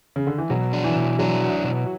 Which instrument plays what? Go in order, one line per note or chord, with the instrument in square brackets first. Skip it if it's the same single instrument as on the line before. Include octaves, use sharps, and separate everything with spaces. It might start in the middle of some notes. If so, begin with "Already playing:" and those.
[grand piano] C#3
D3
E3
[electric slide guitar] B2 [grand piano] F#3
[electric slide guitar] D4
[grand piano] E3
[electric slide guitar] B2
[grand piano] F#3 [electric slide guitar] D4
[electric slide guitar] F#4
B2